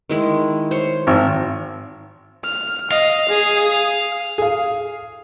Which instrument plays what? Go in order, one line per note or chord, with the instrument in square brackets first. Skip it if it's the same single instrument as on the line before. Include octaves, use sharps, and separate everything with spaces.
[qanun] D#3 G#3 E4
C5 C#5
[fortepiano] G#1
[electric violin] F6
[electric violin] D#5 [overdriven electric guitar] F5
[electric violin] G#4 D#6
[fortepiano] G#4 F5